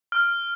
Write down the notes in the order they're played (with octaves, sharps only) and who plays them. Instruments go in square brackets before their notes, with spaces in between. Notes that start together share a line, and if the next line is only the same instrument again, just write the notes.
[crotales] F6